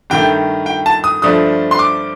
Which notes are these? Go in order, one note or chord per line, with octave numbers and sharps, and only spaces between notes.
G2 D#3 A3 G5
G5
A5
D#6
G2 F3 A3 D4 D#6
C6
D6